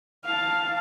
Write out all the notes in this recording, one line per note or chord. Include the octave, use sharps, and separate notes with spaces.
F5 A5